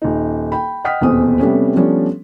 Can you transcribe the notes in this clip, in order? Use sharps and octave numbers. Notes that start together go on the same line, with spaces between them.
D#1 D#4
G5 B5
D#5 F#5 G5 D#6 F6 B6
D#1 E2 B2 C4 C5 D#6
C3 G3 A3 B3 C#4
F3 G3 A3 B3 C#4 D4